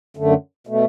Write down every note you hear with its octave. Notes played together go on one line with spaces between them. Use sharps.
F#2 D3 A3
B2 A3